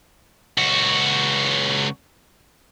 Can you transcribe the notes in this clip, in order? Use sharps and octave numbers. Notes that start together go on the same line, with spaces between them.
C#2 F#4